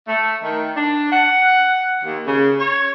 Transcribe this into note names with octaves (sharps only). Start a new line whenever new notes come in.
A3
D#3
D4
F#5
D#2
C#3
C#5